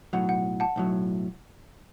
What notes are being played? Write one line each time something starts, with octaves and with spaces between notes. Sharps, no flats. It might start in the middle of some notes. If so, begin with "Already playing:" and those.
B1 A2 F#3 F#5
F#5
F#5 A5
B1 A2 F#3